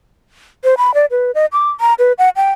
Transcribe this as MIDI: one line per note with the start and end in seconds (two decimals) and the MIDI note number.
0.64 0.75 72
0.78 0.94 83
0.94 1.06 74
1.11 1.31 71
1.35 1.46 75
1.52 1.70 86
1.80 1.94 82
1.99 2.12 71
2.18 2.29 78
2.36 2.52 79